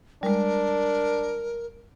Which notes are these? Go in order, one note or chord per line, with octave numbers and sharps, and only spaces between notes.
G3 G#3 D4 A#4